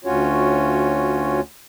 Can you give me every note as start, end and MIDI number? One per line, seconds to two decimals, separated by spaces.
0.05 1.40 38
0.05 1.40 61
0.05 1.40 65
0.05 1.40 66
0.05 1.40 73